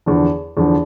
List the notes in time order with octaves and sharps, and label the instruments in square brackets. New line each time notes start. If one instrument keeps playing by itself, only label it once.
[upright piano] E2 D3 F3
E2 D3 F3